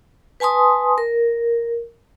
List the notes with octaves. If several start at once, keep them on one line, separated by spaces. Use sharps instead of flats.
B4 G#5 A5 C6 D#6
A#4